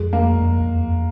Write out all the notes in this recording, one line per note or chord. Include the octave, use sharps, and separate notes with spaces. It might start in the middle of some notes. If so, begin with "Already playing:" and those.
Already playing: F2 G#3
A#3
F2
E2
F2